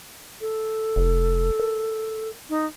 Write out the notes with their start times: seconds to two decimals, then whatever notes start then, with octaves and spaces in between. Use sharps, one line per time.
0.41 A4
0.96 F1
1.60 A#4
2.49 D#4